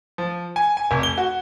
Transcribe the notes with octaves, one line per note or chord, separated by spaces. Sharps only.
F3
G#5
G#5
F1
G7
F#4